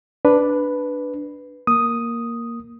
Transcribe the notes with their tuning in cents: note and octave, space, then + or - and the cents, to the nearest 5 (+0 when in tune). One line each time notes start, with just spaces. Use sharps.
D4 +0 B4 +0
A#3 +0 D#6 +0